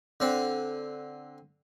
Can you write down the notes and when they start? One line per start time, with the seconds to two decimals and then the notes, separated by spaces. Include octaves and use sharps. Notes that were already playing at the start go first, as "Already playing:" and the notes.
0.20 D3 C4